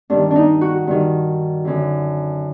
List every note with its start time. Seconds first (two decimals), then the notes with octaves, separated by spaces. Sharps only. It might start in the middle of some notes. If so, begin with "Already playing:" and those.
0.10 G2 D#3 D4
0.31 D4 D#4
0.61 F#4
0.87 G2 D#3
1.65 F#2 D3